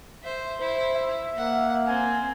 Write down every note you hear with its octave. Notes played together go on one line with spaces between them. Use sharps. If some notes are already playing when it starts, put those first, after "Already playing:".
C5 E5
E4 C5
E5
A#3 F#5
C4 G#5